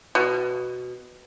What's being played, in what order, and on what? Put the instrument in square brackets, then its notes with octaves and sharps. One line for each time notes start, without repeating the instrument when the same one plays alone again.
[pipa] B2